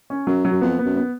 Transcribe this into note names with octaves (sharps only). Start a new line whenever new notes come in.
C#4
F#2 F#3
F#3
F#2
F2 B3
B3
F#2
B3